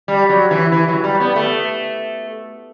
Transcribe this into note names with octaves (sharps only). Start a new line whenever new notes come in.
G3
F#3
E3
E3
F#3
G3
B3
A3